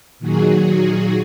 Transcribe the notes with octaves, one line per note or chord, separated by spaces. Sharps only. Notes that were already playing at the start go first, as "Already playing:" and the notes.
A#2 D#3 F#3 F#4 G#4